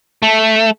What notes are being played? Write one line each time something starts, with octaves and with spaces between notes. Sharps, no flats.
A3